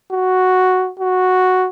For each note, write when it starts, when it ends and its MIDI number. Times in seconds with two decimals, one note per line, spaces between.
0.12 0.90 66
0.99 1.67 66